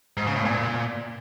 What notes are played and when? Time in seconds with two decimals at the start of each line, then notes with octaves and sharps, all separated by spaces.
0.17 G#2
0.26 C#3
0.36 A2
0.45 A#2